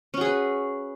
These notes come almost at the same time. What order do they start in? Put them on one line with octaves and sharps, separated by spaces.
C#4 F#4 G#4 B4